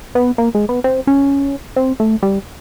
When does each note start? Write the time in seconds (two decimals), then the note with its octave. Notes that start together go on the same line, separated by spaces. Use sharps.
0.15 B3
0.38 A#3
0.55 G#3
0.69 B3
0.84 C4
1.07 C#4
1.76 C4
2.00 A3
2.23 G3